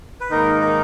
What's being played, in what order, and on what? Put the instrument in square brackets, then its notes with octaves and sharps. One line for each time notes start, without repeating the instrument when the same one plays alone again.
[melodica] B4
[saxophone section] G#2 D#3 A#3 D#4 [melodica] A#4
[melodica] A#4